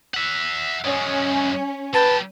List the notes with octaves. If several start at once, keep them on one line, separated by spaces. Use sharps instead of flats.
E5 F#5
F#2 G#3 C#4
F#3 B4 G5 A5